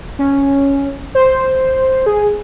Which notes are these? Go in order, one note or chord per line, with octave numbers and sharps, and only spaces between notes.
C#4
C5
G#4